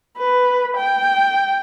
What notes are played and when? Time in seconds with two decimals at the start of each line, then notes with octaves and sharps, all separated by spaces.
0.18 B4
0.77 G5